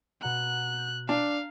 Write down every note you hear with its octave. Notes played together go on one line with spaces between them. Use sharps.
B2 F#5 A#5 F#6
G6
D4 F5 A#5